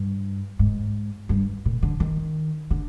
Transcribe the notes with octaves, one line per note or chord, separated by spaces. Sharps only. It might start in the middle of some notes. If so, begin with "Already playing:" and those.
Already playing: G2
G#2
G2
A#2
D3
D#3
D3